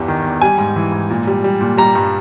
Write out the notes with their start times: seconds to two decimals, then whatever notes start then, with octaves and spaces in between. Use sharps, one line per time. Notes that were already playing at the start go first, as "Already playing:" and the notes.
Already playing: E2 G2 G3
0.08 D#3
0.25 E2
0.41 G3 G#5
0.58 G#2
0.76 E3
0.92 G#2
1.10 A#2
1.27 G3
1.44 G3
1.61 A#2
1.77 G3 A#5
1.95 G2